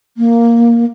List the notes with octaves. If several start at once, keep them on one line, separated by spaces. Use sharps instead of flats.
A#3